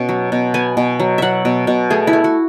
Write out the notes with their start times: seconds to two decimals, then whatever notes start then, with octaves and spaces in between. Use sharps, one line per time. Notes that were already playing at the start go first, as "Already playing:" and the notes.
Already playing: B2 C#4
0.09 F#3
0.32 B2
0.54 B3 G#5
0.77 B2
1.00 F#3
1.18 F#3 E5 F#5
1.45 B2
1.67 B2
1.90 A3 G#4
2.07 E4
2.13 A3
2.24 F#4